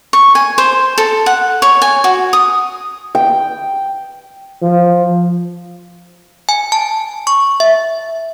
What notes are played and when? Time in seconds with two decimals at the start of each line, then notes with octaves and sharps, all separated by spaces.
0.13 C#6
0.35 G#5
0.58 C5
0.98 A4
1.26 F#5
1.62 C#5
1.82 G#5
2.04 F#4
2.33 D#6
3.15 G5
4.62 F3
6.49 G#5
6.72 A5
7.27 C#6
7.60 E5